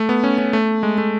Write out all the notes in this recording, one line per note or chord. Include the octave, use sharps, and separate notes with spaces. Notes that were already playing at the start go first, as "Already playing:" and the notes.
Already playing: A3
B3
C#4
C#4
A3
G#3
A3